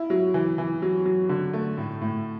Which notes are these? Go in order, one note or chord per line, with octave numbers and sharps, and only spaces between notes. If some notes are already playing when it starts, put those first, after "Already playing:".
Already playing: E4
F#3
E3
E3
F#3
F#3
D3
A3
A2
A2